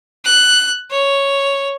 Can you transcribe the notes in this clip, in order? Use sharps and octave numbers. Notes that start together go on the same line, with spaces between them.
F#6
C#5